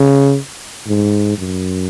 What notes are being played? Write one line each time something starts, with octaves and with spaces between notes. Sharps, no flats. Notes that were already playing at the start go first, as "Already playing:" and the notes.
Already playing: C#3
G#2
F#2